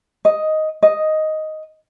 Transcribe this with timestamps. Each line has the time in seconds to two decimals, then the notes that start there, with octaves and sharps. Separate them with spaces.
0.25 D#5
0.83 D#5